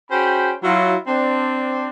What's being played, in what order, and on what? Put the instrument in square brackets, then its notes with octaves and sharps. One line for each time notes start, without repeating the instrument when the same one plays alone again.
[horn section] C#4 F#4 G#4 C5 G5 B5
F#3 E4 F4
C4 D4